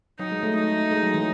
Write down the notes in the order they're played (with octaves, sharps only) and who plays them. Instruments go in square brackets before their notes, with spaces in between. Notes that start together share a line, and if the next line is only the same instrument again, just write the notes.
[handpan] F#3 [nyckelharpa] D#4
[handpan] G#3
A3
[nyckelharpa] D#4
[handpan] G#3
F#3
E3